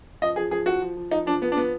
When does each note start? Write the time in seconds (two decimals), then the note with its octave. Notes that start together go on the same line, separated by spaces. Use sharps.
0.22 F3 D#5
0.36 F3 G#4
0.51 F3 G#4
0.66 F3 F#4
0.82 F3
0.97 F3
1.11 F3 D#4
1.26 F3 D4
1.41 F3 B3
1.52 D4
1.57 F3 B3